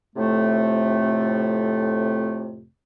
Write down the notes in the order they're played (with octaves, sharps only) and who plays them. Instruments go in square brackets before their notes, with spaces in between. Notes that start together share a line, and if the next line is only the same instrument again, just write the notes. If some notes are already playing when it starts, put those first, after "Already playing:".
[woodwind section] F2 A2 C3 A3